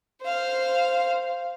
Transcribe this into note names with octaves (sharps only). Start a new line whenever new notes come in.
C5 F5